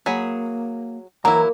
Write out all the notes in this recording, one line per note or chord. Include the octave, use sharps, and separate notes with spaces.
F#3 A#3 G#4 B5
E3 F#3 A#3 E4 A#5